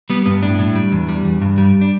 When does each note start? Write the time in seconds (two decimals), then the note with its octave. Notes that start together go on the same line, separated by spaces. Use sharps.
0.10 G3 B3
0.26 G2 B3
0.43 A2 D4
0.59 A2
0.75 G3
0.92 E2
1.09 G3
1.25 E2
1.42 G2
1.58 G3
1.81 D4